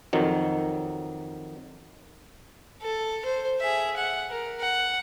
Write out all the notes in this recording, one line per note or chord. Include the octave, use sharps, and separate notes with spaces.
F2 D#3 F#3
A4
C5
G#4 E5
F#5
A#4
F#5